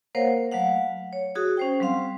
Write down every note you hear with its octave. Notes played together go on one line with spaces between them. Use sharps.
A#3 A#4 C5 C#5 F5 F#5
F#3 A3 F5 F#5
C#5
F#4 G#4 D#6
C#4 C5 G5
F#3 G3 C4 F5 C6